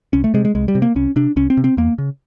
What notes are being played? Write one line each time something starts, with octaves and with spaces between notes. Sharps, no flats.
C2 C#4
A3
C3 G#3
G#3
C2 G#3
G3
C3
A#3
C2 C#4
C3 D4
C2 C#4
C4
C3
C4
E2 A#3
C#3